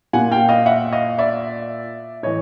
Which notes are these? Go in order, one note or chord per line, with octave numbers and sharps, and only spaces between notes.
A#2 F#5 G#5
F5 G5
D#5 F5
E5 F#5
D#5 F5
D5 E5
A2 E3 C#5 D#5